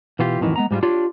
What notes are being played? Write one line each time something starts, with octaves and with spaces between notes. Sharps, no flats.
B2 E3 F4 G4
F2 A2 D#3 E3 F#3
G#3 B3 A#5
G#2 G3 D4 F4
D4 F4 G4 C#5 D5